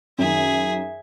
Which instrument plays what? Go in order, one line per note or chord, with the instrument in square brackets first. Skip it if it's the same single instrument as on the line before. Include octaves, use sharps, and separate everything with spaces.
[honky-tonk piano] F#2 D#3 [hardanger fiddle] G#4 E5